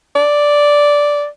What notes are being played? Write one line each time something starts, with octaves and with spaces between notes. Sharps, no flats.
D5